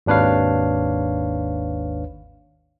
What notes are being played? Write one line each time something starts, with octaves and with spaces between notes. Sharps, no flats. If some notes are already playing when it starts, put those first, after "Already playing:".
G#1 D#2 D4 B4 C#5 F5